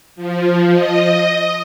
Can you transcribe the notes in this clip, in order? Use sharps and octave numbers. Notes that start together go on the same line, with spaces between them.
F3
D#5